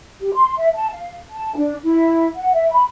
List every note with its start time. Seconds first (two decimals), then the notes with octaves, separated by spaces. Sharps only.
0.21 G4
0.33 C6
0.57 E5
0.75 A5
0.92 F5
1.30 A5
1.56 D4
1.83 E4
2.36 F#5
2.54 E5
2.72 B5